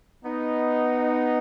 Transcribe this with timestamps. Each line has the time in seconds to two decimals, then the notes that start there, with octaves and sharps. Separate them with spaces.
0.24 B3 D#4